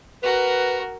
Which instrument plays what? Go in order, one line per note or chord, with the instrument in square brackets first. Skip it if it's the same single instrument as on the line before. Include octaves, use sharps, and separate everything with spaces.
[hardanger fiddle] F#4 A#4 [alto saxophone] B4